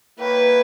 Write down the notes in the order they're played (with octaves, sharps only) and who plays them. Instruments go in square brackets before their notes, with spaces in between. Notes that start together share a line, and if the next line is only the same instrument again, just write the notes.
[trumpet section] A#3 E4 A#4 C#5 G5 [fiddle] B4